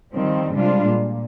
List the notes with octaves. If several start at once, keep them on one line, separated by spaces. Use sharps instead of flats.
D#3 F3 G3 C4
C3 G3 G#3 D4 F4
A#2